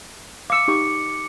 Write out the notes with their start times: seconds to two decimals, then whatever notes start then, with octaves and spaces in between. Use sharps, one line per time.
0.50 F5 D6 E6 C#7
0.68 D#4 G4 C#6